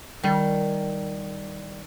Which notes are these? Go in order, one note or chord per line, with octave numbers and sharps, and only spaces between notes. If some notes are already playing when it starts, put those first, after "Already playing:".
D#3 G3